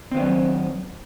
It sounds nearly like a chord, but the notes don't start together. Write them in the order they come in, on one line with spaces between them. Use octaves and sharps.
C4 D#3 B3 D4 F#3